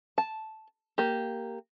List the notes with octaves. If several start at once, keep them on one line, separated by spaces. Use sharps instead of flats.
A5
A#3 G4